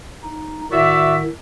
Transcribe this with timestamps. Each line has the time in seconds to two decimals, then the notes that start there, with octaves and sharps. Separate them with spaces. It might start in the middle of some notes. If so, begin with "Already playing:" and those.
0.23 D#4
0.71 A2 D#3 F#4 D5 E5